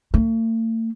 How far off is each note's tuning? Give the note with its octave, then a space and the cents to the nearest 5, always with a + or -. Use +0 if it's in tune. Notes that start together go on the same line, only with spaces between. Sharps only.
A3 +45